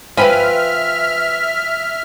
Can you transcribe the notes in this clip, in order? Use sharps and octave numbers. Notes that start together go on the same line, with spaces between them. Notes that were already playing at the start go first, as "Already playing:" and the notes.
F3 B4 E5 G5 G#5 B5 F6